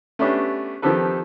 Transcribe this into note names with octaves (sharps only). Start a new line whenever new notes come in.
A3 B3 C#4 D4 G4
D#3 F3 C4 G4 A4 B4